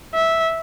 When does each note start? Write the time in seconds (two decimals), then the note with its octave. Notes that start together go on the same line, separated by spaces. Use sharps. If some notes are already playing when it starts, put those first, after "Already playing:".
0.15 E5